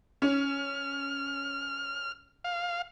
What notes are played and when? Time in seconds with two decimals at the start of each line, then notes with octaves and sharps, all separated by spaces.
0.22 C#4 F6
2.44 F5